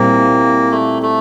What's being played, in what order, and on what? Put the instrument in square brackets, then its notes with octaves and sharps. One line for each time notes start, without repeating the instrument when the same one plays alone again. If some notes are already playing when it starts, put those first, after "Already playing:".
Already playing: [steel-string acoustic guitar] A#2 G3 C4 E4 [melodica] A#3
[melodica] A3
A3